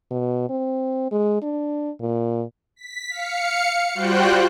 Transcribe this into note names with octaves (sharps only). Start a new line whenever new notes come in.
B2
C4
G#3
D4
A#2
B6
F5 C#7
G3 F4 F#4 C5 G5 F#6